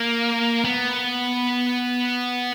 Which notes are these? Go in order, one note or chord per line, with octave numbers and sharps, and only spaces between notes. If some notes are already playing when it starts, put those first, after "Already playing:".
Already playing: A#3
B3